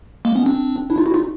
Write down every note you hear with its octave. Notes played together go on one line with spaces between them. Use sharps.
G#3 A#3
B3 C#4
C4 D4
D4 E4
D#4 F4
E4 F#4
D#4 F4